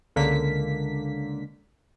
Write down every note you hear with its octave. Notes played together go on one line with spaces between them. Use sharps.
C#2 D3 A#3 B6